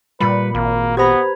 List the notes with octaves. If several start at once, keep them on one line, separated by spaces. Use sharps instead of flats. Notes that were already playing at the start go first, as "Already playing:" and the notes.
A#2 G3 B4 B5 C#7
G#1 A#3
B3 G4 B4 C5 A#5 B5 G#6